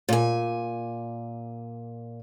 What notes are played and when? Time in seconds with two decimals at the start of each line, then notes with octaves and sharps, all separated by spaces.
0.09 A#2 G#5